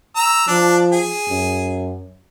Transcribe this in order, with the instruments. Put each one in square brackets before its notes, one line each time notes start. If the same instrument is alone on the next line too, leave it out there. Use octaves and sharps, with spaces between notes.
[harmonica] A#5 E6
[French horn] F3 [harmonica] D4
[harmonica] G#4
[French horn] F#2